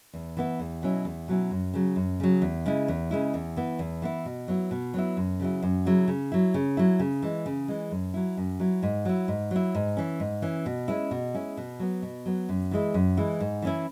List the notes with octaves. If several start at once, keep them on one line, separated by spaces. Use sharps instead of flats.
E2
E3 B3 E4
E2
B2 F#3 C#4 E4
E2
B2 F#3 C#4 E4
F#2
C#3 F#3
F#2
C#3 F#3
E2
C#3 G#3 E4
E2
C#3 G#3 E4
E2
E3 B3 E4
E2
E3 B3 E4
B2
F#3 B3 E4
B2
F#3 B3 E4
F#2
C#3 F#3 E4
F#2
C#3 F#3 E4
C#3
F#3 E4
C#3
F#3 E4
C#3
E3 G#3
C#3
E3 G#3
F#2
F#3 E4
F#2
F#3 E4
G#2
F#3 E4
G#2
F#3 E4
G#2
E3 C#4
G#2
E3 C#4
B2
G#3 C#4 E4
B2
G#3 C#4 E4
B2
F#3 B3
B2
F#3 B3
F#2
E3 G#3 E4
F#2
E3 G#3 E4
G#2
E3 C#4 E4